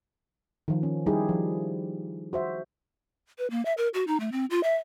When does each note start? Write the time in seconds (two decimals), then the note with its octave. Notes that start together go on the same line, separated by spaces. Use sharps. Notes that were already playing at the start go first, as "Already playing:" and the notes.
0.68 D#3 F3
0.83 C#4
1.06 G3 D#4 E4 G4 G#4
1.29 F3
2.33 F#4 C5 E5
3.38 B4
3.50 A#3
3.65 E5
3.77 A#4
3.94 F#4
4.07 D#4
4.20 A3
4.32 C4
4.50 F4
4.63 E5